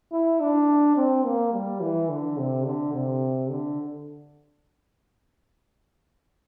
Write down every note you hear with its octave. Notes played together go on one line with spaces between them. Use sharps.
E4
D4
C4
A#3
G3
E3
D3
C3
D3
C3
D3